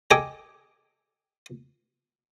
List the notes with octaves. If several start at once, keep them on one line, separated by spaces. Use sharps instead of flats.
G4 A4 D#5 G#5 D6